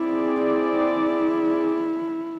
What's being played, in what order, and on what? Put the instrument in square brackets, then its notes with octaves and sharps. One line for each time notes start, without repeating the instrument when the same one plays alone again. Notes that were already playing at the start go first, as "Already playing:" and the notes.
Already playing: [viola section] C4 G#4 D5 [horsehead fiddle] E4
[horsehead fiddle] E4